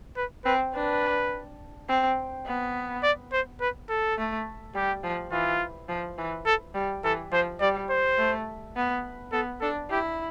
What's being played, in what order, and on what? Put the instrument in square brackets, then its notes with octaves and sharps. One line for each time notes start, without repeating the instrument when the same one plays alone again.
[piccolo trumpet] B4
[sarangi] C4 [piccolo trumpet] B4
[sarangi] D4 [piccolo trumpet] B4
[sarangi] C4
B3
[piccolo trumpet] D5
C5
B4
A4
[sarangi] A3
[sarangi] G3 [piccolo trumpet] G4
[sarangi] F3
[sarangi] E3 [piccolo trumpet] F4
[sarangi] F3
E3
[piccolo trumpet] A4
[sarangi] G3
[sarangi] E3 [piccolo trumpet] A4
[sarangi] F3 [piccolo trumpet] C5
[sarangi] G3 [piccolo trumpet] D5
[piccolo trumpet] C5
[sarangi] A3
B3
[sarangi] B3 [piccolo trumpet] A4
[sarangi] D4 [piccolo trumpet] A4
[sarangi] E4 [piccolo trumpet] G4